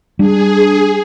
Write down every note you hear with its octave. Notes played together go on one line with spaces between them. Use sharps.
G3 D4 G#4